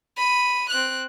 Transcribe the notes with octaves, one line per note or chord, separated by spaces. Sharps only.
B5 D#7
C4 F#6